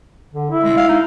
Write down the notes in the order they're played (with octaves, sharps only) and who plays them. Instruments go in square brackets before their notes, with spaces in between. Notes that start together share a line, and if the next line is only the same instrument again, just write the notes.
[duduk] D3
E4
[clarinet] G#3
F5
D#4